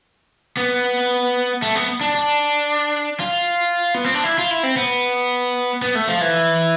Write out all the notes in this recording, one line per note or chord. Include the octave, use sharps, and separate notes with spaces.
B3
A3
B3
D4
D4
F4
B3
C4
D4
E4
F4
E4
C4
B3
B3
A3
F3
E3